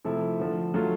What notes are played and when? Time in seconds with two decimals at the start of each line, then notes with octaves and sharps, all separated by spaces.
0.05 C3 F3 A3 C4 E4
0.39 D3 F3 A3
0.74 F#3 A3 D4 F4